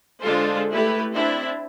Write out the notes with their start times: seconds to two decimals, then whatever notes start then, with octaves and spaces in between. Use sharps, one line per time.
0.22 D3 G#3 D4 F4 A4 C5
0.72 A3 E4 G4 B4
1.12 C4 D4 E4